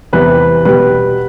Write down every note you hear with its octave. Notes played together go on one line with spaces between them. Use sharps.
E2 C3 E3 G3 B4
B2 G3 B4